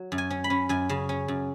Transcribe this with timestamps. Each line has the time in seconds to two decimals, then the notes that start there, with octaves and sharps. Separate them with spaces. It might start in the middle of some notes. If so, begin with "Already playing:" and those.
Already playing: F#3
0.12 F#2
0.18 G#5
0.30 C#4
0.44 B5
0.50 C#4
0.69 F#2 G#5
0.89 C#3
1.09 C#4
1.28 F#2